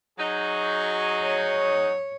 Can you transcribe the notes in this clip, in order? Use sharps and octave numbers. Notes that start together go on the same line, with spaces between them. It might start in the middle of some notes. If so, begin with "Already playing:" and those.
F#3 D#4 G#4
C#5